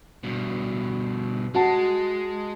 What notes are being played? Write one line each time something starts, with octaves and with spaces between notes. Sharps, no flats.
G2 B2
G#3 F#4 F#5 A5